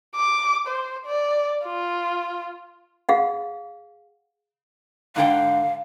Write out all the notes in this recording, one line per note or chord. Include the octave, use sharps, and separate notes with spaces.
D6
C5
D5
F4
G#4 F5 F#5
G#2 D3 F5 G5